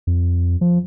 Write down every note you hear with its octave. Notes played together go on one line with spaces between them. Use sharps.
F2
F3